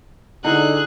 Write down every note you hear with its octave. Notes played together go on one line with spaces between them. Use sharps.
D3 D#4 E4 G#4 F#6